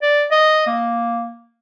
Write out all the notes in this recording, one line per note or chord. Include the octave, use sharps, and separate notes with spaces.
D5
D#5
A#3